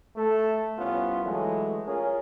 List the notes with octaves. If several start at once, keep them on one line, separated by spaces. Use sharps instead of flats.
A3 A4
C2 B3 C#4 F4
E3 F#3 G#3 A3
C#4 F4 G#4 A#4